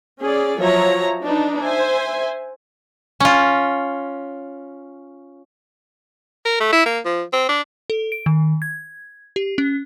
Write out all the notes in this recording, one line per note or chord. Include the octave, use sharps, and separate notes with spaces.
C#4 G#4 D5
F3 F#3 C#5 E5 A#5
D4 D#4 B4
C5 E5 G#5
C#4 F4
A#4
A3
E4
A#3
F3
C4
D4
A4
D7
D#3
G#6
G4
C#4